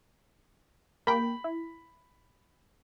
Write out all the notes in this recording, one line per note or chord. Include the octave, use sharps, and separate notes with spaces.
A#3 G5 B5
E4